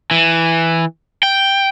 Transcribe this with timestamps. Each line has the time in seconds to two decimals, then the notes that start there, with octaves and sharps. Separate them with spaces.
0.11 E3
1.23 G5